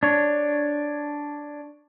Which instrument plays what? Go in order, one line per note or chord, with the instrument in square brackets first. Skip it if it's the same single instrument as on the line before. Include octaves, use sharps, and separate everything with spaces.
[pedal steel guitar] D4 C#5